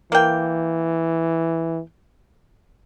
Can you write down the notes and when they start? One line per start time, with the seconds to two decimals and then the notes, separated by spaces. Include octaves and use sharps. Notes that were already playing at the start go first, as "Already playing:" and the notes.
0.12 E3 A#3 G5